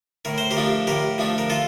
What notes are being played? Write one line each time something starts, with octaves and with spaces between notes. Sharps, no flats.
A2 A#4
C5
G4 A#4
F3 A3 D4
A2 G4 A#4
F3 A3 D4
A#4
F4 A4